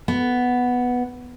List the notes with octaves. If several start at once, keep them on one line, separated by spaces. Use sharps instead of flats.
B3